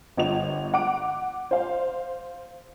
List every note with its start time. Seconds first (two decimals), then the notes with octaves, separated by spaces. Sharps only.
0.17 G1 D#5 F7
0.74 F#5 D6 D7
1.51 C5 F5